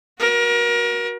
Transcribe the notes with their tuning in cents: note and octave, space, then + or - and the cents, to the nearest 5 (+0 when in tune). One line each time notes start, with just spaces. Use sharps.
F#4 +0 A#4 +30